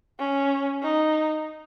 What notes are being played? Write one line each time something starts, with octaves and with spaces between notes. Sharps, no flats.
C#4
D#4